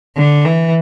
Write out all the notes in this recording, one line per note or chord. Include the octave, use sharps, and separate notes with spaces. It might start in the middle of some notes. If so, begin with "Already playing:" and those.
D3
E3